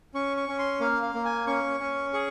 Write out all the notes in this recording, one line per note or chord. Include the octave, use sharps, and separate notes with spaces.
C#4 C#6
C#6
C#4
C6
A#3 F5
F5
A#3
G#5
C#4 C#6
C#4
G#4 C#6